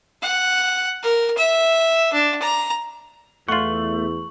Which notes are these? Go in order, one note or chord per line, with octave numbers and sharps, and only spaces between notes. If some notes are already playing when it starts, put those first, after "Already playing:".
F#5
A#4
E5
D4
A#5
E2 A3 F4 F#5 C#6 F#7